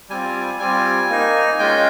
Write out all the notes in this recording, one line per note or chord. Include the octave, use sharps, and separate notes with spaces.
G3 C4 F4 G#5
G3 C4 F4
A#3 D#4
G#3 C#4 F4 G5